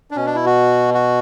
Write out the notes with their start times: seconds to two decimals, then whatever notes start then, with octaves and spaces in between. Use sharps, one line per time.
0.11 D4
0.16 B2 C#4
0.26 D4
0.35 E4
0.46 F#4
0.94 F#4